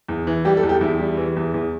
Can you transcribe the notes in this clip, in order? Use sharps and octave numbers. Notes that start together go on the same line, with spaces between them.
E2
E3
G3 G4
A4
E2
G4
E2 E4
G3
E3
E2
E2